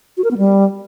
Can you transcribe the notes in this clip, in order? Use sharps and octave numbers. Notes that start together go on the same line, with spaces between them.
F#4
A#4
B3
G3